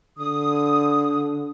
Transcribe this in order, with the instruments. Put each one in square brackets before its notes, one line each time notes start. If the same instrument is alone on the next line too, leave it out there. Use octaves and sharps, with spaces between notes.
[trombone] D3 [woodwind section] D#6